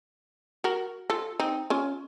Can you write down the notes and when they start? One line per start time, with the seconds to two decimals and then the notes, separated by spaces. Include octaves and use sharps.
0.64 F#4 A#4
1.10 F4 A4
1.40 C4 D#4
1.70 C#4 F4